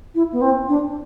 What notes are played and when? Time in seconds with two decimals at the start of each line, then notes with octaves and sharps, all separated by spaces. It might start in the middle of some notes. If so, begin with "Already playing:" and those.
0.14 E4
0.32 B3
0.41 C4
0.68 D4